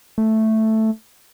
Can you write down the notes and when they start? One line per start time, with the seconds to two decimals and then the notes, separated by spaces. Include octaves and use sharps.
0.18 A3